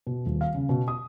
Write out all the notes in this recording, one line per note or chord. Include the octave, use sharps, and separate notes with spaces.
B2
D#1
F5
C#3
B2
D#6